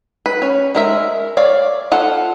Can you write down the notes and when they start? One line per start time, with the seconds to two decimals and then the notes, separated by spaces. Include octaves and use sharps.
0.26 B4
0.42 C#4
0.75 G#3 A#4 E5
1.37 C#5 D5 F5
1.92 F4 A4 F#5